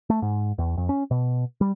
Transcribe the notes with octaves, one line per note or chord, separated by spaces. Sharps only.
A3
G#2
E2
F2
C#4
B2
G3